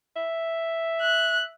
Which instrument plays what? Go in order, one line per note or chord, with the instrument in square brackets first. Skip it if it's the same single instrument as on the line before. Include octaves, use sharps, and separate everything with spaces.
[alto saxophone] E5
[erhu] F#6